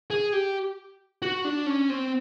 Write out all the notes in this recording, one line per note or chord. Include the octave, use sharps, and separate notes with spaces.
G#4
G4
F#4
D4
C#4
C4